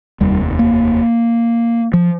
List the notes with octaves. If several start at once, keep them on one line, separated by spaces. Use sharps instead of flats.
F1 D#2 G3
A#3
F3